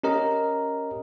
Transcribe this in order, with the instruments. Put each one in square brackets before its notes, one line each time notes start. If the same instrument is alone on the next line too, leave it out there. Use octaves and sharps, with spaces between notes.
[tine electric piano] C#4 G4 A#4 D#5 A#5